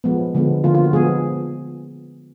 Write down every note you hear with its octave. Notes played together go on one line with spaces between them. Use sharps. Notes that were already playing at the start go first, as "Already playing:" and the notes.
F3 G#3 B3
D3 F3 G#3 B3
D3 F3 A#3 F4
F4
F#4
F3 G#3 B3 G#4